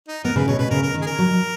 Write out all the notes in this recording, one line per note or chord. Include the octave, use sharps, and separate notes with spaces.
D#4
B3 A#4
C#3 B4
B2 C#5
B2 B4
C#3 A#4
A#4
D#3
G#4
A#4
F#3